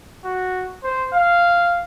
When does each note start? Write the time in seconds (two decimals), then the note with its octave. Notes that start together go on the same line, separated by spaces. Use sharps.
0.25 F#4
0.83 C5
1.14 F5